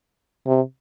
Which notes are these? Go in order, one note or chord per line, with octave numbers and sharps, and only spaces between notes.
C3